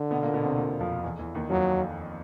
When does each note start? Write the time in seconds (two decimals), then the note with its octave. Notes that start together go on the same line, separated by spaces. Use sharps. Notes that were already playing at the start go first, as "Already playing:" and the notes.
Already playing: D3
0.11 B2 B3
0.23 A#2 A#3
0.34 B2 B3
0.46 C3 C4
0.57 A#2 A#3
0.80 F2 F3
1.03 E2 E3
1.19 E2 E3
1.35 D#2 D#3
1.50 F2 F3 F#3